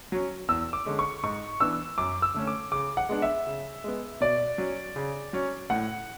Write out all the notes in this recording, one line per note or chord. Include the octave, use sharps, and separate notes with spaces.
F#3 C#4
E2 E6
D6
D3 G#3 C#4
C#6
G#2 C#6
E3 B3 D4 E6
F#2 D6
E6
D3 A3 C#4
D6
C#3 D6
F#5
G#3 B3 D4
E5
C#3
G#3 B3
B2 D5
F#3 C#4
C#3
F#3 C#4
A2 F#5